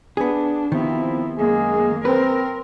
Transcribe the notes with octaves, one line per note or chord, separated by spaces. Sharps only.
B3 D4 G#4
C3 D#3 F3 B3 C4 E4
F#2 G#3 A#3 G#4
C4 A#4 B4